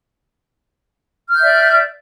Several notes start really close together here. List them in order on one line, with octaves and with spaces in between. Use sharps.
F6 G6 E5 D5